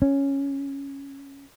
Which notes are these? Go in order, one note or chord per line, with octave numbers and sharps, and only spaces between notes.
C#4